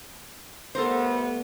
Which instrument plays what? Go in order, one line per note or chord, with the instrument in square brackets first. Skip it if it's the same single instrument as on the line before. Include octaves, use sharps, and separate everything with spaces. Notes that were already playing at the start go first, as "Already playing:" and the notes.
[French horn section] G3 A3 B3 [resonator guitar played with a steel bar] A4 A#4 C5